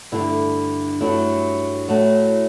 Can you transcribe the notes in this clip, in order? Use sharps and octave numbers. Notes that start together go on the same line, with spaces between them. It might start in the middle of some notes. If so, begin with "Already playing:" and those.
G2 D3 A3 E4
G2 F#3 A3 E4
A2 F#3 A3